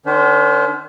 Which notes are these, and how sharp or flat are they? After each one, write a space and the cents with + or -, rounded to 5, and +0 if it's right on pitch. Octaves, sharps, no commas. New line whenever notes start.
D#3 -35 C#4 +45 C5 -15